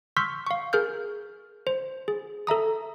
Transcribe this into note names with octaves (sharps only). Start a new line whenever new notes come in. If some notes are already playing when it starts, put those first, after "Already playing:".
C6 C#6 E6 F6 G6 B6
F5 C#6
G#4 A#4 F6 G6
C5
G#4
A4 E5 A#5 D#6